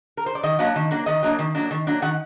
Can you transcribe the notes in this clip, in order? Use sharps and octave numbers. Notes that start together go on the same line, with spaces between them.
A#4
C5
D5
D#3 D#5
F#3 A#3 D4 F#5
D#3
F#3 A#3 D4
D#3 D#5
F#3 A#3 D4
D#3
F#3 A#3 D4
D#3
F#3 A#3 D4
D#3 F#5